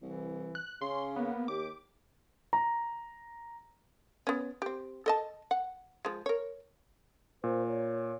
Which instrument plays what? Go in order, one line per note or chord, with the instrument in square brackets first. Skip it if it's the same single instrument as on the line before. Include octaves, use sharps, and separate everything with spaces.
[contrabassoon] C2 [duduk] E3
[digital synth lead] F#6
[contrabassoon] C#3 [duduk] C#4 [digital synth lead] C6
[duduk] A#3 [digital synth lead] B3
[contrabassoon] D#2 [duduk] G4 [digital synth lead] D6
[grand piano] A#5
[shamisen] B3 C#4
C4 G4
A4 D#5 A5
F#5
F3 G#3
A#4 C#5
[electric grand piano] A#2 [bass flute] C5
[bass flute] C#5